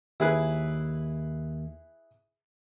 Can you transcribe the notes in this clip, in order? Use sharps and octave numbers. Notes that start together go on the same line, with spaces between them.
D#2 E4 G#4 B4